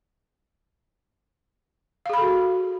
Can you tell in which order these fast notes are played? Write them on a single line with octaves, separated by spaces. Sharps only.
F5 G#4 B5 A4 F#4